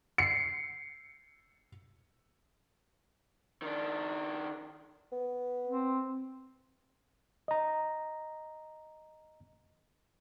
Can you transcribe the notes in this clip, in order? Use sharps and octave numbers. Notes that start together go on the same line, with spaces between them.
C7 C#7
D#3 D4
B3
C4
D#5 A#5